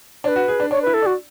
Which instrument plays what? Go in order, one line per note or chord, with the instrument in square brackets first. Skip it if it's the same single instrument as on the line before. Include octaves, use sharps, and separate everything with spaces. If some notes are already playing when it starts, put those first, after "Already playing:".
[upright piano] D4 [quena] C#5
[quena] B4
[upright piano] F#4
G#4
D4
[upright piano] D4 [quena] C#5
[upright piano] E4 [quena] B4
[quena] A4
[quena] F#4 [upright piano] D5